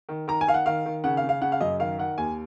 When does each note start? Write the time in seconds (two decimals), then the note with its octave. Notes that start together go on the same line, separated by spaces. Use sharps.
0.09 D#3
0.28 D#3 A#5
0.41 G#5
0.47 D#3 F5
0.54 F#5
0.66 D#3 F5
0.86 D#3
1.04 C#3 F#5
1.17 F5
1.24 C#3
1.29 F5
1.41 C#3 F#5
1.52 F5
1.61 F#2 D#5
1.80 D#3 F5
1.99 D#3 F#5
2.18 D#2 G#5